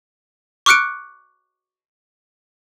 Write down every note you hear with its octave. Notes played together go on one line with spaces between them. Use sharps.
C#6 D6 F6 F#6 C#7 D7